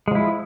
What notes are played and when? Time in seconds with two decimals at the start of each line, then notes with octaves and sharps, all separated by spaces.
0.08 G#3
0.11 F3
0.15 E4